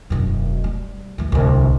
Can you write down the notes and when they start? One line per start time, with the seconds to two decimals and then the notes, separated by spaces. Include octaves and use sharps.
0.10 E1 F#2
0.64 G3
1.18 E2 E3
1.32 D1 C2